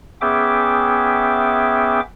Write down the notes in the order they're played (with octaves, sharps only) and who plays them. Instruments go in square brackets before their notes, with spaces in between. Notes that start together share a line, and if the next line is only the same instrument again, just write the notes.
[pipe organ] B3 C#4 G#4 E5 G5 D6